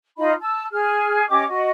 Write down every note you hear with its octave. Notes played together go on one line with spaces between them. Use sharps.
D#4 F4 D#5 B5
A5 E6
G#4 F6
C#4 G4 D#5 D6
F#4 D#5